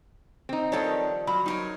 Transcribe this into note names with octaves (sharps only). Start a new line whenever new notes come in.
C4 D#4
D#3 F3 G3 A4 C#5
F#3 F4 B5
C4 D#4 A#4 C#5